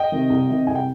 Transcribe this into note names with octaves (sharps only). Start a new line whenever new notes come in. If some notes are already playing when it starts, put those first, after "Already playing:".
Already playing: D#5 G5
C3 D#3
C2
C3 D#3
C2 G#5
G5